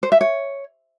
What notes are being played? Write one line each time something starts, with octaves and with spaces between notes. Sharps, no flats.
C5
E5
C#5